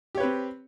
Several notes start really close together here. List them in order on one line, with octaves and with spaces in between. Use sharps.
G4 C#5 B4 C4